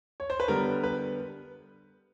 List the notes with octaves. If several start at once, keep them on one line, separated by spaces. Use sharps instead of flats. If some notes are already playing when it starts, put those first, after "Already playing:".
C#5
C5
B4
D3 G3 B3 A#4
B4